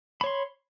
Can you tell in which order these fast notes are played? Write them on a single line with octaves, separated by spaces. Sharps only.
B5 C#5 C6